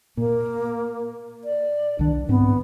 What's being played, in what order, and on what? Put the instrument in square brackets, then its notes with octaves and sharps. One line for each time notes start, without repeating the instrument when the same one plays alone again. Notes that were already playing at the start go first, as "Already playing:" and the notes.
[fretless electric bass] A#2 [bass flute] A#3
[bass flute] D5
[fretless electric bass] C2 D#3 [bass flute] D4
[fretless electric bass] G#2 C4 [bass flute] B3